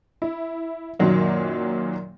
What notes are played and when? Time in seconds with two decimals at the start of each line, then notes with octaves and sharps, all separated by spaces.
0.22 E4
0.99 F#2 A#2 D#3 F#3 A#3